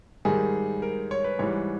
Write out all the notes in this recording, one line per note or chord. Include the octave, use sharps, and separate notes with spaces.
G#2 D#3 G3 G#4
A#4
C#5
B4
G#2 E3 G3 C#5